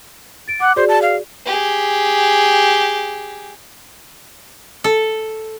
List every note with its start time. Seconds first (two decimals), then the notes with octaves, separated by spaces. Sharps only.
0.48 A6 D7
0.60 F#5 D6
0.76 F#4 G#4 C5 D5
0.89 A5
1.02 F5
1.45 G4 G#4
4.84 A4